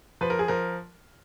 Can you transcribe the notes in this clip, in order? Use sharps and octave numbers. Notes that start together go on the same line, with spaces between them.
F3 B4
A#4
G#4
F3 A#4